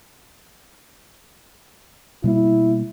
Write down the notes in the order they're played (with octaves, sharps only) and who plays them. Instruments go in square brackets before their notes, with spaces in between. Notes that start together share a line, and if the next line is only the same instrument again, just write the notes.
[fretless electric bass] B2 G3 A#3 [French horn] E4